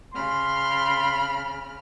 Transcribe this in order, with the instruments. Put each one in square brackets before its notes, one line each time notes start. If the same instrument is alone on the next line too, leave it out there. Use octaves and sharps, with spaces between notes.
[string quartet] C#3 B5 F6 [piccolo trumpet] C6